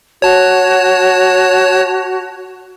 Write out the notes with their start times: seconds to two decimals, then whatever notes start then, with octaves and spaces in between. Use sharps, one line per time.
0.22 F#4 C#5 A5